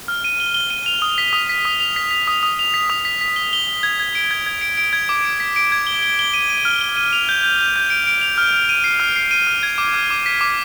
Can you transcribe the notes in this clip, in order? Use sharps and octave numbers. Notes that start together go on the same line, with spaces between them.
F6
D#7
G7
G7
D#7
F7
D#6
B6
D#6
B6
D#6
F7
B6
B6
D#6
D#6
F7
B6
D#6
B6
B6
G7
G7
G7
G#6
G#6
D7
G#6
G#6
D7
D7
G#6
D6
D7
B6
D7
G#6
G7
G7
G7
D#7
D#7
F6
G7
D#7
F7
G6
G6
G6
G6
D7
D7
F7
F6
F6
D#7
C7
F6
C7
D#7
F6
G#6
D6
F6
D6
B6
D6